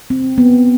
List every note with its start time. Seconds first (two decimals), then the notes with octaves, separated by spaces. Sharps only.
0.10 C4
0.38 B3